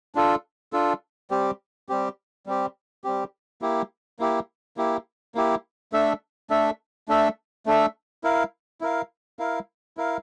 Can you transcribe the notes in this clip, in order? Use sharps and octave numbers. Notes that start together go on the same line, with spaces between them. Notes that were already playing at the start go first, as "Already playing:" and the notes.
D4 F4 A4
D4 F4 A4
G3 C4 G4
G3 C4 G4
G3 C4 G4
G3 C4 G4
A#3 E4 G4
A#3 E4 G4
A#3 E4 G4
A#3 E4 G4
A3 D4 A4 E5
A3 D4 A4 E5
A3 D4 A4 E5
A3 D4 A4 E5
E4 A#4 F5
E4 A#4 F5
E4 A#4 F5
E4 A#4 F5